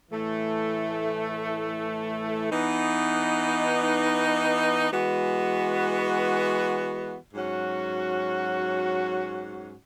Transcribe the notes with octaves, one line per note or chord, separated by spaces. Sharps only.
A2 E3 A3
E3 B3 D#4
E3 G#3 B3 F#4
G#2 F#3 C#4 F#4